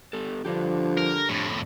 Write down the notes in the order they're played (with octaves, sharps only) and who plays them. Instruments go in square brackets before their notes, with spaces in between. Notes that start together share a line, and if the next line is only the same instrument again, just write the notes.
[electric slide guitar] B3 G4 A4
[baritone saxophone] D3 [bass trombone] F3 [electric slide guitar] D4 G4
[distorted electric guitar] A#4
F2 A2